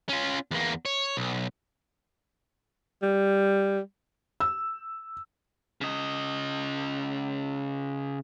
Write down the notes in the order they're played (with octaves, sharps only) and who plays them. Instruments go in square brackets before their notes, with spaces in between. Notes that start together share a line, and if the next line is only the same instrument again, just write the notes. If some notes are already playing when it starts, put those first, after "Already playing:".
[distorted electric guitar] C#4 F4
E2 A#3
C#5
B1
[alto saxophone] G3
[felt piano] E6
[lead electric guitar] C#3 D#5